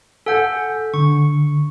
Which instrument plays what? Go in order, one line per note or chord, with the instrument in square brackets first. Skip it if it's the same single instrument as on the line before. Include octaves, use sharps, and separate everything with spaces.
[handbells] A4 F#5 [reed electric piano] G#5 E6 G6
[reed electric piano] D3 [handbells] C#6